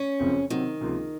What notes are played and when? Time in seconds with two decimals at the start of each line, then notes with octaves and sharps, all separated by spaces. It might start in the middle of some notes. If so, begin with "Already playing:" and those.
Already playing: C#4
0.20 F#1 F2 C#3 F3 C4
0.50 C3 D#3 F#3 C4
0.81 C#2 C3 F3 A#3 F4